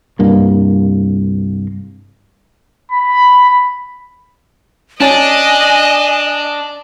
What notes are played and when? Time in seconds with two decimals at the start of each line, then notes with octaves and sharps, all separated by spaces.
0.19 C2 G2 A#3
2.91 B5
5.00 C#4 D4 D#5 G#5 A5